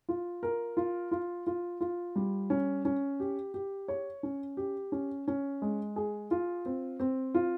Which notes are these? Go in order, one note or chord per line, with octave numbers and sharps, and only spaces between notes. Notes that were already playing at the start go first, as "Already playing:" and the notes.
F4
A#4
F4
F4
F4
F4
G3
C#4
C#4
G4
G4
C#5
C#4
G4
C#4
C#4
G#3
G#4
F4
C4
C4
F4